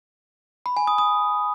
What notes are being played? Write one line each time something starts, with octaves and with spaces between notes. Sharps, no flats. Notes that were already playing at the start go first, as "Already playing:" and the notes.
B5
G#5
D#6
D#6